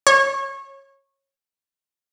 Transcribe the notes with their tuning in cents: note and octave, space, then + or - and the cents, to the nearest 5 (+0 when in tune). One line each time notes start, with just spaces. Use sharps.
C#5 -20